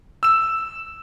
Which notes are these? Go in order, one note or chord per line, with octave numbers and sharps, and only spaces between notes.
E6 E7